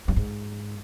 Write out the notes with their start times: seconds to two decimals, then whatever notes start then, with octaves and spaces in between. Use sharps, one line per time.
0.08 G2
0.16 G#2